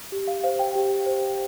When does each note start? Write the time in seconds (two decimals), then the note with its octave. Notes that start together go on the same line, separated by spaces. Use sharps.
0.12 G4
0.28 F5
0.44 C5 F5
0.59 G5
0.75 G4
1.06 C5